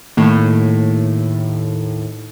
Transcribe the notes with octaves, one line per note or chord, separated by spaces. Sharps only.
D#2 A2